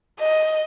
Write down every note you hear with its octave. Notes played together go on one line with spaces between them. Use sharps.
D#5